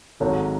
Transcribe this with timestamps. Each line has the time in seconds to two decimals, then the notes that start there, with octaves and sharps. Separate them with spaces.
0.20 G#1 G#2 F#3 A4 C#5